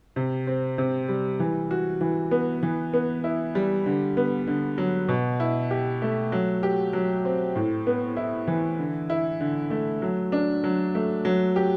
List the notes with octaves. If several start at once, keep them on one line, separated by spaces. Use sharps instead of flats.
C3
C4
C3
G3
E3
F#4
E3
B3
E3
B3
E4
G3
D3
B3
D3
F#3
B2
E4
G4
A3
F#3
G4
F#3
C4
A2
B3
E4
E3
D3
E4
D3
A3
F#3
D4
F#3
A3
F#3
G4